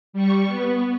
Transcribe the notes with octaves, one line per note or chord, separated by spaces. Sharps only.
G3 C#6
B3